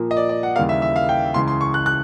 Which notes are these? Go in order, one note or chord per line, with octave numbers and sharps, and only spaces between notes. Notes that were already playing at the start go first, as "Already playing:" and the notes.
Already playing: A#2 F3 A#3
D#5
D5
D5
F#5
D#2 C#3 E3 G3 A#3 F5
E5
E5
F5
G5
C#2 C#3 E3 C6
C6
C#6
F#6
F#6